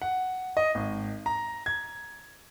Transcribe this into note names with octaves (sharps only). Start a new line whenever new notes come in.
F#5
D#5
G#1
A#5
G#6